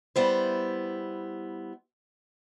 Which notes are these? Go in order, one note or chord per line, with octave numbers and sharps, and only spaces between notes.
G3 B3 E4 C5